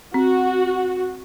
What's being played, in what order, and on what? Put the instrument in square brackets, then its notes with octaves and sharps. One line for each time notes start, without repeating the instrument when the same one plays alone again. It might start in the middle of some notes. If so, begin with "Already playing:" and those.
[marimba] C4 [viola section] F#4